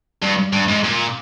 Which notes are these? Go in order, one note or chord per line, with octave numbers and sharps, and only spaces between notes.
G2
G2
G#2
A#2